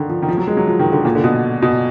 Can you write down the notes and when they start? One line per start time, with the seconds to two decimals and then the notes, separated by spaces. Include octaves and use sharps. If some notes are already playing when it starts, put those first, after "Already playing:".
Already playing: D3 D#3
0.09 F3
0.22 D#3
0.28 F3
0.38 F#3
0.47 G#3
0.57 F#3
0.67 F3
0.79 D#3
0.92 D3
1.05 A#2
1.15 D3
1.24 B2
1.62 B2